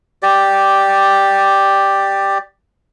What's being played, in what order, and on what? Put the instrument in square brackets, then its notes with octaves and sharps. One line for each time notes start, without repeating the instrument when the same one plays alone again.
[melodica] G4 D5